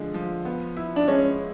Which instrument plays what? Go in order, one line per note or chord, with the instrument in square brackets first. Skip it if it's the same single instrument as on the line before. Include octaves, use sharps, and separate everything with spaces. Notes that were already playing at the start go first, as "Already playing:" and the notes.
Already playing: [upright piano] D3 F3 G#3
F3
B3
E4
[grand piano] D4
[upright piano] G#3 [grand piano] C#4